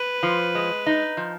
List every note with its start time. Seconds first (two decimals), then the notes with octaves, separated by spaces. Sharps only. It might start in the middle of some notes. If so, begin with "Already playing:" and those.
Already playing: B4
0.23 F3
0.55 G#3
0.86 D#4
1.17 F3